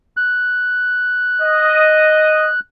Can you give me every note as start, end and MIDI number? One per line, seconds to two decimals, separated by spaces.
0.17 2.60 90
1.42 2.48 75